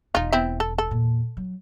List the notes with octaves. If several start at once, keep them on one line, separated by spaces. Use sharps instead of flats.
E1 E2 D#4 F4
B3 C4 E4
A4
A4
E2 A#2
F#3